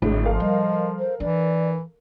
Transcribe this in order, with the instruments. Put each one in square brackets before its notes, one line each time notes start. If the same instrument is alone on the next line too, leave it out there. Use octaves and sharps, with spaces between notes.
[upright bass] G#1 [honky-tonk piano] A2 D3 G#3
[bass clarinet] F3 [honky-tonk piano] A4 A#4 F5
[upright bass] G3 [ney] D#5
[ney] C5
[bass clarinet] E3 [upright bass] D4 [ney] D5